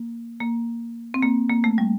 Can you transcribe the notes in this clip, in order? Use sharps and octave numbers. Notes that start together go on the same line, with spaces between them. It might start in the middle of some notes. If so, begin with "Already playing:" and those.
Already playing: A#3
A#3
C4
A#3
A#3
A3
G3